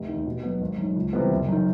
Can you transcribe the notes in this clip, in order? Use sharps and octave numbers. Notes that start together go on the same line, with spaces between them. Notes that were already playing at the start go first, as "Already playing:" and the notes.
Already playing: F1
D#2 D#3
B2
F#3 B3
G#1
F#2 D#3
C#2
C3 E3 G3 B3
F#1
F#2 D#3